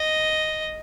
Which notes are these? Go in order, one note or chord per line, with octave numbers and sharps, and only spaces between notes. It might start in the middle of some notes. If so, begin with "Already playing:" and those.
Already playing: D#5